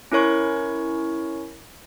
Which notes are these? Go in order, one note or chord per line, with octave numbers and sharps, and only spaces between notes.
C#4 E4 A#4 C#5 C#6